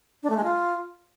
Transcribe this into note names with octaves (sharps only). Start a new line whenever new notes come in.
D4
A3
G#3
F4